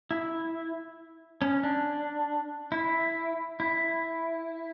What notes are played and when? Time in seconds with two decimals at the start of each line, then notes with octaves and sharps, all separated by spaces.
0.11 E4
1.42 C#4
1.63 D4
2.72 E4
3.60 E4